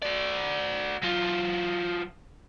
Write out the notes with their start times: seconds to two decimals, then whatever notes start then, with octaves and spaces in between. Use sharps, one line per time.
0.03 F#4 D5
1.02 F#3 F4